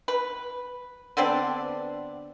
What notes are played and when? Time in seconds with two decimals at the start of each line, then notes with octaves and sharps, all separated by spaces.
0.08 B4
1.17 D3 B3 C4 D4